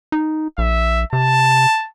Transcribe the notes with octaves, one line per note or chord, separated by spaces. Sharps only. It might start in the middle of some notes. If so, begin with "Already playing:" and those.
D#4
A#1 E5
C3 A5